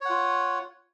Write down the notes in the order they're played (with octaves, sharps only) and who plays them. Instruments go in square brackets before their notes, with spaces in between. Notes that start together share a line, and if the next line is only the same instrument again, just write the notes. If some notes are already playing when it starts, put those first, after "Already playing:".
[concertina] C#5
F#5
F4